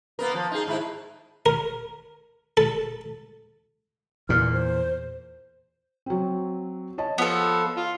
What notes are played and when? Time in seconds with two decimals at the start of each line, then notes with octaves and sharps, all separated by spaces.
0.19 A#3 B3 A#4
0.34 F3
0.51 D#4 G#4
0.67 G#2 D#4 E4
1.46 A#4
2.57 A4
4.29 E2 A#2 F6
4.53 C5
6.06 F#3 C4
6.98 C#5 D#5 A5
7.18 F3 B3 A4
7.76 F4